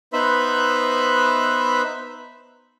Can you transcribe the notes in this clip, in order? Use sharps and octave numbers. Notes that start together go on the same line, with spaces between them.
B3 D#4 B4 C5 E5 B5